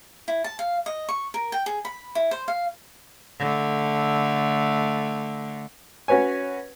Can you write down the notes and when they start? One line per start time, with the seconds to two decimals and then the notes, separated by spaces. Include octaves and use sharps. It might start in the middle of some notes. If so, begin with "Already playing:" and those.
0.28 E4
0.44 A5
0.59 F5
0.86 D#5
1.09 C#6
1.34 A#4
1.52 G5
1.66 G#4
1.85 B5
2.15 E4
2.31 C5
2.48 F5
3.39 D3 A3
6.08 C#4 F#4 B4 C#5 G#5